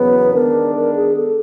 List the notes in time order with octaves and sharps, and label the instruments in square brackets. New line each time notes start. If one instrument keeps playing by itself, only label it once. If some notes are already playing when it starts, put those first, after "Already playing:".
Already playing: [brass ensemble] E2 C#3 F#3 B3 [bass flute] B4
[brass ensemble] D#3 G#3 B3 D4 [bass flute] A#4
[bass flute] A#4
G#4
A4